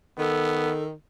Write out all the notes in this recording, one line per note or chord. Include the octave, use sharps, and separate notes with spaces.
D#3 B3 A4